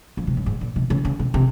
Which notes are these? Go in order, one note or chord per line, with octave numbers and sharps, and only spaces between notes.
F3
C3
F#2
G#2
A#2
C3
C#3
C#3
C3
C3